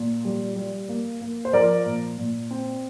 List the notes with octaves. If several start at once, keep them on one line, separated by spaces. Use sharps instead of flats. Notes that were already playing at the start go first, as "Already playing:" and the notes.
Already playing: A#2 A#3
G3
G3
A#3
A#3
C5
F3 A#4 D5
A#2
A#2
C4